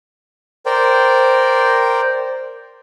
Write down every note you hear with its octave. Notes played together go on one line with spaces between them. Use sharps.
A#4 C5 D5 G5